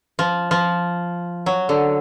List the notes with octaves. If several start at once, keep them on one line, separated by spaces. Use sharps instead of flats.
F3
F3
F#3
D3